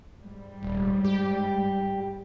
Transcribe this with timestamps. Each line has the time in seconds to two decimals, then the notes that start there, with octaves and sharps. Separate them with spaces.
0.20 G#2 G3
0.63 D#1
1.05 G4